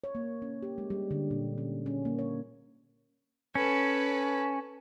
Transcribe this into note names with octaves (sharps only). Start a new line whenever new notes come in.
C#5
A#3
C#4
G4
G#3
G3
D3
A#2
C#4
C#4
A#3
C#5
C#4 A4 B4